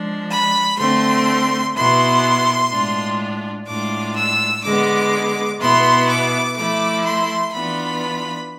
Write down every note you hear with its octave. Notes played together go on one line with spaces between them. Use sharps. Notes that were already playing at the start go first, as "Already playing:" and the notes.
Already playing: F3 G#3 D4
B5
D3 A3 C4 C6
B2 B3 E4 C6
A2 G#3 D4 F4
A2 G#3 D4 F4 D6
E6
D3 G#3 B3 D6
B2 B3 E4 C6
D6
F3 A3 E4 D6
C6
E3 B3 D4 F4 B5